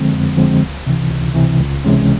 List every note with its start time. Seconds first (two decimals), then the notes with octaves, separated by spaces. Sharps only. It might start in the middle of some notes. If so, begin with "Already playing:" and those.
Already playing: D3 F3 G#3 C4
0.13 F2
0.37 D3 F3 G#3 C4
0.61 C#2
0.87 C3 E3
1.11 C#2
1.35 C3 E3
1.60 C#2
1.85 C3 E3 G#3 C#4